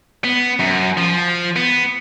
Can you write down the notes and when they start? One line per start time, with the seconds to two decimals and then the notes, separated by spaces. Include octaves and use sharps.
0.24 B3
0.60 F#2
0.97 F3
1.56 B3